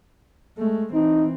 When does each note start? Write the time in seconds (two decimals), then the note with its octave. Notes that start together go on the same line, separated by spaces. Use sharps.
0.58 G#3 A3
0.93 E3 C4 D#4